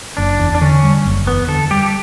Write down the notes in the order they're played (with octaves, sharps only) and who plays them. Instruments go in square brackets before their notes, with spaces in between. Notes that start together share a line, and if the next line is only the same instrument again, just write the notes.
[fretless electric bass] F#1 [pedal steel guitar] D4
[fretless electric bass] E2
[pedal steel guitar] D4
[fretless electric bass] D3 [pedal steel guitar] C#4
[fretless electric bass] G3
F#1
[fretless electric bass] E2 [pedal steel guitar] B3
[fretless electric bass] D3 [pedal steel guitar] A4
[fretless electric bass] G3 [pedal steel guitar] G4